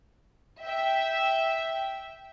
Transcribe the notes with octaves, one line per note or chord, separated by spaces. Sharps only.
E5 G5